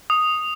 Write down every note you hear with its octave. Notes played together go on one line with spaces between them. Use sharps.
D#6